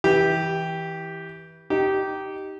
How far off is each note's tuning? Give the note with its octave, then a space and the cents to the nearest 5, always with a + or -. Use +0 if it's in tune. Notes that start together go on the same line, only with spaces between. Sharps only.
E3 -20 G4 +0
D#4 +0 G4 -15